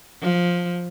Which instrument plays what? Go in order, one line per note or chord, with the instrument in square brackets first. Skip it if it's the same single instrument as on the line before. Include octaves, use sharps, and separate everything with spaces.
[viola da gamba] F3